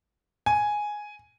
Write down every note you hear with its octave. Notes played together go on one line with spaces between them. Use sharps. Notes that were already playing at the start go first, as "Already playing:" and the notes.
G#5